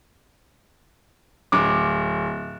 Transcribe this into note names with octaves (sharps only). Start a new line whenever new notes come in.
D1 D6